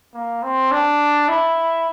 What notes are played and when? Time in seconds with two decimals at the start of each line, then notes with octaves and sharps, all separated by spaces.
0.14 A#3
0.43 C4
0.72 D4
1.29 E4